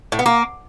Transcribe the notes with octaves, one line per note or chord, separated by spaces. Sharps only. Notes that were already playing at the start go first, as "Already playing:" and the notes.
A2
B3
A#3